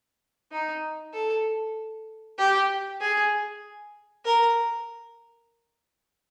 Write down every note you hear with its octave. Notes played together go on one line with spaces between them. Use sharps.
D#4
A4
G4
G#4
A#4